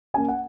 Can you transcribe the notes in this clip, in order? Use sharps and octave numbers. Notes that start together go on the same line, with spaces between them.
A#3 C#4 G#5
F#5